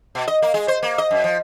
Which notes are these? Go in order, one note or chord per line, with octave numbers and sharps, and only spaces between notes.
B2
D#5
A#3
G#3
C5
A#3
D#5
F#2
F3